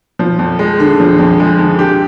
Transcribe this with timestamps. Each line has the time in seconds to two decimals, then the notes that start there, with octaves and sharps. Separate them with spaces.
0.19 F3
0.39 F2
0.59 G#3
0.80 D3
1.00 F3
1.19 F2
1.40 G#3
1.59 D3
1.79 G4